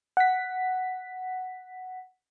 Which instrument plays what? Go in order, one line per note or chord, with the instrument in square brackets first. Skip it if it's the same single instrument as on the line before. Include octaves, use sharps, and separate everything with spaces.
[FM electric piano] F#5 B6